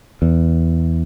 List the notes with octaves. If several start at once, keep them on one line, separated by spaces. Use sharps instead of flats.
E2